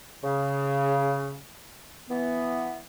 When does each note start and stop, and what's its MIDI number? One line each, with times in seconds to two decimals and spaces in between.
0.22 1.38 49
2.09 2.79 52
2.09 2.79 59